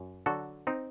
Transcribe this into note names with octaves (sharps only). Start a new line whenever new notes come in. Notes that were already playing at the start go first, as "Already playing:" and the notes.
Already playing: F#2
D3 F#3 F#4 A4
C4 D#4